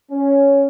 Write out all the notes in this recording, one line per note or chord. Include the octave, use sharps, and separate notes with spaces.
C#4